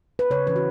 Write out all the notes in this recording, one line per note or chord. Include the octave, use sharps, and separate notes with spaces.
B4
C#3 C#5
E3 C#4 B4
F#4